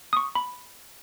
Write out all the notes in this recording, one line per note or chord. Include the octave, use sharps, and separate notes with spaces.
D#6
C#6
B5